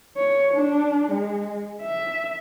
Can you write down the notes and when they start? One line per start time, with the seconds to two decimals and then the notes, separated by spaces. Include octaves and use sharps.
0.17 C#5
0.54 D4
1.11 G#3
1.82 E5